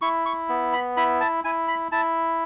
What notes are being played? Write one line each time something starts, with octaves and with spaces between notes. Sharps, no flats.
E4 C#6
C#6
B3
B5
E4 B5
A5
E4 G#5
B5
E4 A5